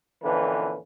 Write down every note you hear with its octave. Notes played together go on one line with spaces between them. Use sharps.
F2 A#2 D3 E3 C#4 B4